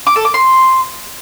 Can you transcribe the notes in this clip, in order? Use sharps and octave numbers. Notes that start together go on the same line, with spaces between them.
D6
A4
D6
C6